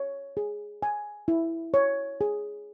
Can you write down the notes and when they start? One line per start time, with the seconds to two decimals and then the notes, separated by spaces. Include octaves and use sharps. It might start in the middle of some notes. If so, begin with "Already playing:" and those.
Already playing: C#5
0.37 G#4
0.83 G#5
1.28 E4
1.74 C#5
2.21 G#4